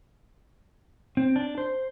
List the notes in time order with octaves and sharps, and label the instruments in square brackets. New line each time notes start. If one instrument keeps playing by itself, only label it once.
[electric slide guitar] C4
D4
C5